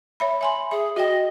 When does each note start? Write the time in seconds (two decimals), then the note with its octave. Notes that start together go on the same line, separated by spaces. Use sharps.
0.20 C#5 E5 B5
0.41 E5 G#5 B5 C6
0.71 G#4 E5
0.96 F#4 D#5 G5